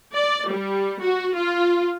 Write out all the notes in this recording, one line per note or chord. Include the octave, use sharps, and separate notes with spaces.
D5
G3
F#4
F4